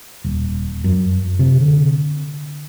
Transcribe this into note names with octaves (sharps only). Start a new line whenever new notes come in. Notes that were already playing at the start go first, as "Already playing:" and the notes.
D#1
F#2
C3
D3